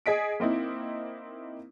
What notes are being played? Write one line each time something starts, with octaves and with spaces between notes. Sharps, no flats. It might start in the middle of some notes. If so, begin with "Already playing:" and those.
G#4 D#5 B6 D7
A#3 C4 D#4 E4